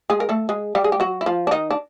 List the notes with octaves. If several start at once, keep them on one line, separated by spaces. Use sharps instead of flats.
G#3 G#4
A#4
A3 A4
G#3 G#4
G3 G4
G#4
G4
F#3 F#4
E4
F3 F4
D4
D#3 D#4
D4